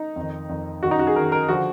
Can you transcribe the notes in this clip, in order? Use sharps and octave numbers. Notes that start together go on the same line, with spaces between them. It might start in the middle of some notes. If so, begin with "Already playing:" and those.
Already playing: D#4
F2 D#3
F2 D#3
F#2 D#3 F#4
D#4
F#4
G#4
F#2 D#3 A#4
A#4
D3 F3 F#4